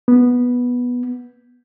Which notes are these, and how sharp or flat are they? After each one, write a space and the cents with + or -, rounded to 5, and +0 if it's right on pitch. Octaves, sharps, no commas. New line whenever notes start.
B3 -10